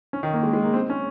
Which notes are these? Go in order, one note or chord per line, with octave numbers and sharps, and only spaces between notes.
C#4
D#3
A#3
G#3
G#3
A#3
C4
C#4